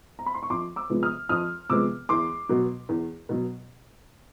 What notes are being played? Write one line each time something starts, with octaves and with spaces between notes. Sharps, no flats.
A#5
B5
C6
C#6
F2 C6 D6
D6 E6
C3 F3 G#3 B3
D#6 F6
F2 D#6 F6
C3 F3 G#3 B3 D6 E6
E2 C6 D6
B2 F#3
E2
B2 F#3